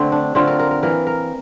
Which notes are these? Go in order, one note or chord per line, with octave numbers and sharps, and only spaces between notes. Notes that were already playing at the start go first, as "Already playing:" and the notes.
Already playing: D3 A3 C4
D4
D3 A3 C4 F4
A#4
A#4
A#4
E3 A#3 A#4
A#4